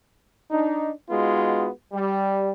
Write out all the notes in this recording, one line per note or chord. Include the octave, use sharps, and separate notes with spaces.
D4 D#4
G#3 B3 D#4 F4 F#4
G3